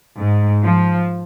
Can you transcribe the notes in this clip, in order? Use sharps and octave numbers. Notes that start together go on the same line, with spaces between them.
G#2
F3